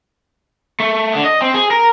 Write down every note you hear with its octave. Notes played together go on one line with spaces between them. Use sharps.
A3
D3
D#5
C4
G#4
A#4